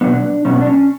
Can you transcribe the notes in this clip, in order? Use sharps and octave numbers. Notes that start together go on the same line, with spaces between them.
B2 F#3 B3 D4
B2 F#3 B3 C#4
D4
C#4